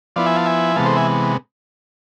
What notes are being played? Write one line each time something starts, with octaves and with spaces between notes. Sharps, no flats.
F3 B3 E4 D5 F5
E5 G#5
F5 A5
E5 G#5
C3 E3 G#3 B3 F5 A5
A4 C5
E5 G#5